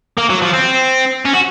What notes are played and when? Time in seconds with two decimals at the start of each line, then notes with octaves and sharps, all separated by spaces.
0.17 A#3
0.29 F#3
0.41 F3
0.53 C4
1.25 C#4
1.34 F#4